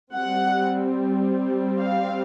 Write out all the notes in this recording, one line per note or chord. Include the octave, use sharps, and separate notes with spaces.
G3 C4 F#5
F5